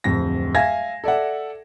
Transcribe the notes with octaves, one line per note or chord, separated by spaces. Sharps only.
D1 F2 A#6
E5 F5 G#5 G#6 A#6
A4 D5 E5 F#5